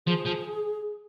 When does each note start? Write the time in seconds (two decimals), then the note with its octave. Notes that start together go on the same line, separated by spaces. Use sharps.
0.07 F3 G#4
0.26 F3